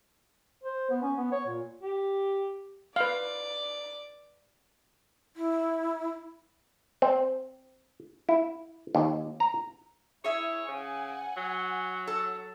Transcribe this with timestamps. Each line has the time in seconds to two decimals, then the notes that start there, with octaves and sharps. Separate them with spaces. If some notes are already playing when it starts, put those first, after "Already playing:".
0.63 C5
0.90 B3
1.02 C#4
1.17 B3
1.32 C#5
1.47 A#2
1.82 G4
2.96 B4 D5 F5
5.36 E4
7.02 C4
8.29 E4
8.95 D#2
9.40 A#5
10.24 E4 G#4 C#5 E5
10.68 C#3 F#5 G#5
11.37 F#3
12.07 A4